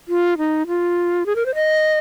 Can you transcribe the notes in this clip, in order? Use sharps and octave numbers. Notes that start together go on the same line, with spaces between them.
F4
D#4
F4
G#4
A#4
C5
D#5